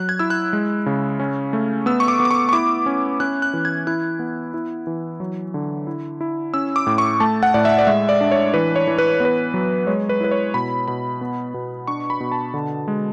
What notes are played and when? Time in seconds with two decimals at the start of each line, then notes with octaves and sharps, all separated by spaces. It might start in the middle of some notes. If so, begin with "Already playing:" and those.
Already playing: F#3 F#6
0.09 G#6
0.19 E4 E6
0.30 F#6
0.53 G#3
0.86 C#3
1.20 C#4
1.53 A3
1.86 B3 E6
2.00 C#6
2.08 D6
2.20 B3
2.25 D6
2.31 C#6
2.49 C#6
2.53 E4 D6
2.86 C#4
3.20 C#4 F#6
3.42 F#6
3.53 E3
3.65 G#6
3.87 E4 F#6
4.19 B3
4.54 E4
4.87 E3
5.20 F#3
5.54 D3
5.87 E4
6.21 E4
6.54 C#4 E6
6.76 D6
6.87 A2
6.98 C#6
7.20 A3 A5
7.43 F#5
7.54 A2 D5
7.65 E5
7.78 D5
7.87 G#3 E5
8.09 D5
8.21 D4
8.32 C#5
8.54 E3 B4
8.76 C#5
8.87 E3
8.98 B4
9.20 B3 B4
9.54 F#3
9.87 G#3 C#5
10.09 B4
10.20 E4 B4
10.31 C#5
10.54 B2 B5
10.88 B2 B5
11.21 B3
11.54 B2
11.87 D4 C#6
12.10 B5
12.20 B2
12.32 A5
12.54 D3
12.88 G#3